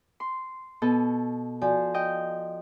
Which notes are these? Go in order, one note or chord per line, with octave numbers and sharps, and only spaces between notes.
C6
B2 B3 A4
F3 F#4 D5 G#5
D#5 G5